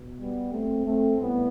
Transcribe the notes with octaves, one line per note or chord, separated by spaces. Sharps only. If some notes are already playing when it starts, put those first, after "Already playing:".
Already playing: B2
G3 B3
A3 C4
A3 C4
A2 G3 B3